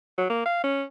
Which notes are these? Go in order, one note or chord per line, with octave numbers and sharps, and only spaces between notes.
F#3
A#3
F5
C#4